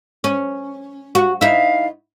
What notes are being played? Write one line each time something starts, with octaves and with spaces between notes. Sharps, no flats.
C#4
F#4
D#4 E4 F5